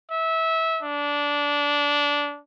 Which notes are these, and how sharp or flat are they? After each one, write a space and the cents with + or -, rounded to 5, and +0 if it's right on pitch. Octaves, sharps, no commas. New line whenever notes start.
E5 -20
D4 -15